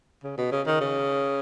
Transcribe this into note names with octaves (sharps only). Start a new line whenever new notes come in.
C#3
B2
C#3
D#3
C#3